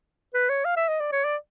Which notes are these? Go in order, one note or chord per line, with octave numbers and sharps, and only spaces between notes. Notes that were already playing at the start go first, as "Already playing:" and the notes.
B4
C#5
F5
E5
D#5
D5
C#5
D5